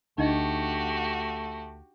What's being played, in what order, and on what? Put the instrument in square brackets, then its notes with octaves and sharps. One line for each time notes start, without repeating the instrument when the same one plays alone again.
[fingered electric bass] D2 [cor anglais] A3 [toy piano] D4 D#4 D#5 [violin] F#4 G4